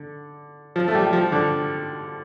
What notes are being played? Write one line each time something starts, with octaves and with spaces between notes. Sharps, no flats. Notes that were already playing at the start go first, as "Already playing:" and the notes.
Already playing: D3
F3
A3
G3
G3
F3
D3